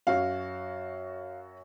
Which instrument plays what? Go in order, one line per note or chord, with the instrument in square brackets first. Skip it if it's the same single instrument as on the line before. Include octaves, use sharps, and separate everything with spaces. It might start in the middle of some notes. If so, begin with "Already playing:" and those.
[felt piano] F#2 F#4 C#5 [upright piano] F5